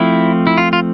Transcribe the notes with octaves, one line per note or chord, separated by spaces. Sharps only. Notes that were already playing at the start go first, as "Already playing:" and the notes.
Already playing: F3 A3 C4 E4
E4
F4
F4